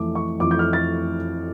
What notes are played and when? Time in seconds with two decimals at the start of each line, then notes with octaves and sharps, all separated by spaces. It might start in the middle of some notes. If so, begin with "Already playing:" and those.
Already playing: F2 E3 A3 D6
0.15 C#6
0.40 F2 E3 A3 D6
0.51 G6
0.59 F6
0.73 A6